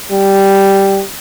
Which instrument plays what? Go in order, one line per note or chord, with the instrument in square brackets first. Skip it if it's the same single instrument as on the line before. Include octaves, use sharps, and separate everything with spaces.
[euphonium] G3